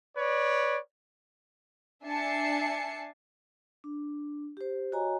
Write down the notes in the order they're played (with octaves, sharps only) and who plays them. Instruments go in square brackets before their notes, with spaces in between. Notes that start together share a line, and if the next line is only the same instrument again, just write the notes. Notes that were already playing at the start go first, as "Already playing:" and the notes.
[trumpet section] B4 C#5 D5
[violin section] D4 E5 G#5 A5 C7 C#7
[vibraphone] D4
G4 C5
F#4 C#5 D#5 G#5 A#5